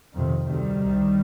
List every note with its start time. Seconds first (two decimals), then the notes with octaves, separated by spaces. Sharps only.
0.14 F2 C3 D#3
0.47 D2 C3 D#3 G3
0.80 C2 C3